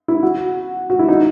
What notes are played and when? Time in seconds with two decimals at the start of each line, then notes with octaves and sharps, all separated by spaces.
0.08 E4
0.23 F#4
0.90 F#4
0.99 E4
1.08 D#4